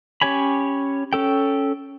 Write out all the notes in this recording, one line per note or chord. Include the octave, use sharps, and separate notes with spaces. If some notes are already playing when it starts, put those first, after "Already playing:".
C#4 G4 C#5 G#5 B5
C#4 A4 G5